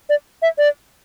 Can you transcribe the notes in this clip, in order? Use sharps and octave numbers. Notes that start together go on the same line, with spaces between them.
D5
E5
D5